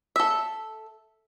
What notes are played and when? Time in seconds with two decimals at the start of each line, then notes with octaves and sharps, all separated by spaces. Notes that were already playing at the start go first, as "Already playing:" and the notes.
0.16 A4 E5